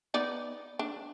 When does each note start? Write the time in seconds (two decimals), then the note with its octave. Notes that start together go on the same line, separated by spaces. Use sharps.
0.14 B3 D#4 D5
0.79 D4